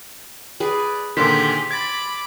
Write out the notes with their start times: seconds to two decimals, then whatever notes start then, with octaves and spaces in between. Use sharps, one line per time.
0.60 G#4 B4 D5
1.17 A#2 D3 D#3 G4 G#4 C5 B6
1.71 B5 D6 G#6 A6